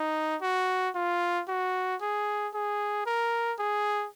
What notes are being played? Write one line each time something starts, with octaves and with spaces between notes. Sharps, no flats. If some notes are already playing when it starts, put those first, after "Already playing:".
Already playing: D#4
F#4
F4
F#4
G#4
G#4
A#4
G#4